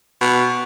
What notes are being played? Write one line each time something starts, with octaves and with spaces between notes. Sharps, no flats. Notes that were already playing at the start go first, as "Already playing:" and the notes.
B2